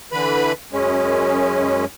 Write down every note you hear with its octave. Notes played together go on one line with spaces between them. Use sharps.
D3 E3 B4 B5
F#2 G#3 C#4